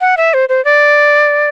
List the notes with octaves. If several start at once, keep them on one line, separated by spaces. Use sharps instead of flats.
F#5
E5
C5
C5
D5